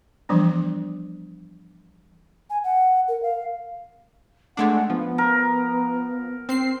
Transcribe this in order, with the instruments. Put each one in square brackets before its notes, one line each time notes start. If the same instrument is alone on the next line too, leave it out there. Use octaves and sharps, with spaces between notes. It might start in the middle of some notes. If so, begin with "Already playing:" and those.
[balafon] E3 F3 G3 B3 D4
[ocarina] G#5
F#5
A#4
F5
[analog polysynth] G#3 A3 D4 [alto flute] F#5
[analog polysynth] F3 [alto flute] B3
[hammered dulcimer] A#4
[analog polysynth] C4 C7